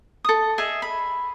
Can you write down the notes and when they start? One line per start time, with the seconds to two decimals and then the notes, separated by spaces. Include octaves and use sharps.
0.25 A4 D#6
0.58 G#4 D#5 E5
0.82 B5